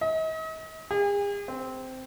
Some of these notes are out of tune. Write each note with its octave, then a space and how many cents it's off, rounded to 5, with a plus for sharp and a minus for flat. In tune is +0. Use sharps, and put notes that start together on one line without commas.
D#5 +40
G#4 -45
C4 -10